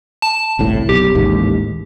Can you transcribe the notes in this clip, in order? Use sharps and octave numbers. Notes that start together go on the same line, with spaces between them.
A5
G1 C2 A2
B1 G4
A1 D#2 G#2